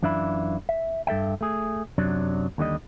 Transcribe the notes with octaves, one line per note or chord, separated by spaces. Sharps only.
F#2 E3 D4 F4 E5 B5
E5
G2 A4 E5 G5
A3 G#4
F#2 C3 F#3 D4
D#2 D3 G3 D#5